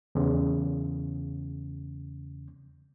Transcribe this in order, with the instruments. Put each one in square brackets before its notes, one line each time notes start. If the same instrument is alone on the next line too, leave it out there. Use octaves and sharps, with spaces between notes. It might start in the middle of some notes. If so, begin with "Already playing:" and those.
[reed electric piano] E2 C#3